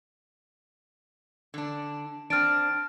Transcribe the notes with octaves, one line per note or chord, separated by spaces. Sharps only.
D3 D4
C4 D4 F6 A6 D7